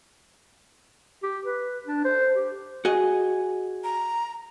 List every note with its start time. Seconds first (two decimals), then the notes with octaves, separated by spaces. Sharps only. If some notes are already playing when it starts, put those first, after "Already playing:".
1.23 G4
1.45 B4
1.87 D4
2.05 C5
2.34 G4
2.85 F#4 G#4 D#5
3.84 A#5